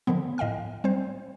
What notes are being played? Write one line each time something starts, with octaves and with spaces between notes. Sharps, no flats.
D3 D#3 F3 B3
A2 D#5 F5 G5 F6
G3 C4 C5